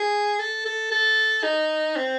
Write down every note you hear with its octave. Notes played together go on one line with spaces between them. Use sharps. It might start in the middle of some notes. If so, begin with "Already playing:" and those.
Already playing: G#4
A4
A4
A4
D#4
C4